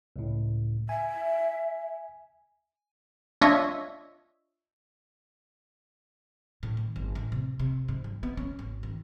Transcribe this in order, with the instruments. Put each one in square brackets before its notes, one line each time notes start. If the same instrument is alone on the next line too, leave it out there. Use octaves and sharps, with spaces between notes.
[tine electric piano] C#2 A2
[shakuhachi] E5 [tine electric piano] G#5
[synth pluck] D4 F4 C#5 D#5 E5
[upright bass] A2
D#3
G1
A1
C3
C3
G#2
G3
B3
C#4
G#1
D#3